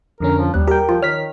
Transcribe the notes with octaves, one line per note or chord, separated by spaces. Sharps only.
F2 D3 C#4 A#4
F3
D#2 G3 F#6
G4 A#4 G5
F3 F4
D#3 C#5 F6 B6